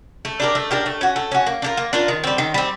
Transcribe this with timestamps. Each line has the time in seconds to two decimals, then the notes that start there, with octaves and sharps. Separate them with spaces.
0.25 A3
0.40 D4 G4 A#4
0.55 A3
0.71 D4 G4 A#4
0.86 A3
1.01 C#4 F#4
1.16 A3
1.32 C#4 F#4
1.46 A#3
1.62 D4 F4 A#4
1.77 A#3
1.93 D4 F4 A#4
2.08 D#3
2.24 G3 C4
2.38 D#3
2.54 G3 C4